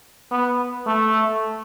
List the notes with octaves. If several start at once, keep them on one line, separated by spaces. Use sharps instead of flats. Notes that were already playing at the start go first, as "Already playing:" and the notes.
B3
A3